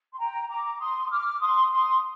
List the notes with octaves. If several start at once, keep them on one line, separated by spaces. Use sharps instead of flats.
C6
G5 A#5
A#5 D6
C6 D#6
D#6
D6 F6
C6 D#6
C6 D#6